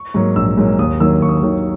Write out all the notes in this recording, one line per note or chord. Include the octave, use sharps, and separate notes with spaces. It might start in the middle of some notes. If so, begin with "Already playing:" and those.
Already playing: C#6
G#2 F#3 A#3
A#1 E6
G#2 F#3 A#3
D#2 D#6
D#3 F#3 A#3 E6
D#2 C#6
D#6
C#6
D#3 F#3 A#3